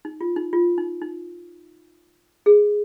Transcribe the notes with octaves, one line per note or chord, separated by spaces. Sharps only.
D#4
F4
D#4
F4
D#4
D#4
G#4